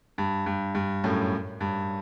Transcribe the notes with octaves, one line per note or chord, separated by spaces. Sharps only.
G2
G2
G2
F#2 A2
G2